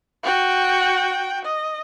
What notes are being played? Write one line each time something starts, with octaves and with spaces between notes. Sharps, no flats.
F#4 G5
D#5